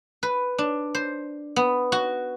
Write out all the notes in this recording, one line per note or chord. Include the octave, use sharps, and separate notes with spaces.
B4
D4
C5
B3
F#4